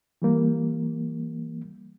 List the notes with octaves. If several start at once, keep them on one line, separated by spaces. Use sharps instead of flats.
E3 G3 A#3